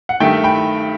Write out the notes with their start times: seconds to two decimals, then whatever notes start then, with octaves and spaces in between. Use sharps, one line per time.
0.09 F#5
0.20 G2 D#3 A3 E5 G5
0.44 G5 B5